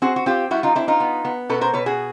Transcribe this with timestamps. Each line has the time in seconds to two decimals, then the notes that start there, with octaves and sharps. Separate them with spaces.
0.02 C4 F#4 G#4
0.16 F#4
0.26 C4 F4 G4
0.51 G3 E4 F#4
0.63 D#4 F4
0.75 C4 D4 E4
0.88 D#4 F4
1.00 B3
1.25 B3
1.49 B2 A4 B4
1.61 A#4 C5
1.73 B2 B4 C#5
1.86 F#4 G#4